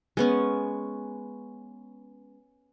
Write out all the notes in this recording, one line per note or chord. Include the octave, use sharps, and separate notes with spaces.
G#3 B3 C#4